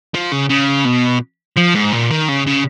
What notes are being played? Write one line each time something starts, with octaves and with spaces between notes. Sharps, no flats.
F3
C#3
C#3
B2
F3
G#2
A#2
D#3
C#3
C#3